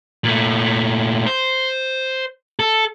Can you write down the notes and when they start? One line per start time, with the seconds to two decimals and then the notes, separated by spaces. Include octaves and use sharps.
0.24 A#2 A3
1.26 C5
2.59 A4